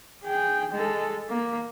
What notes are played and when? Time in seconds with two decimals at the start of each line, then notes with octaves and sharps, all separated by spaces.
0.24 G#4 G5
0.71 G#3 A4
1.29 A#3